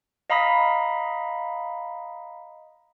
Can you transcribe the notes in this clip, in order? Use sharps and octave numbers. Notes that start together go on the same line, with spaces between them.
D#5 F5 A#5 B5 D#6 B6